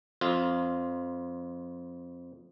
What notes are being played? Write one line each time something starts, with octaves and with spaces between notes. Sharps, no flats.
F2 F4